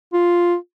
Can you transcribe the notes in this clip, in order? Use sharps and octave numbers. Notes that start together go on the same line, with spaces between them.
F4